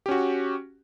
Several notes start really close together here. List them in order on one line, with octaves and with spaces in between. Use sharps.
G4 C#4 F#4